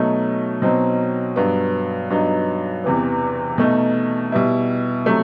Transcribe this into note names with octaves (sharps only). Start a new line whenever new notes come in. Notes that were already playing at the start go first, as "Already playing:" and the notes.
Already playing: B2 F#3 A3 D#4
B2 F#3 C4 D#4
G2 F#3 B3
G2 F#3 B3 D#4
E2 C3 E3 B3
B2 A3 D#4
B2 G3 B3 E4
C3 F#3 A3